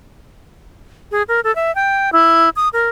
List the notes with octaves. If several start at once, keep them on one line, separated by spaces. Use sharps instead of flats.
G#4
A#4
A4
E5
G5
E4
D#6
A#4